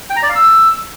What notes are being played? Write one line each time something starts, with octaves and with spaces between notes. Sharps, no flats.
G5
A#5
D5
F5
E6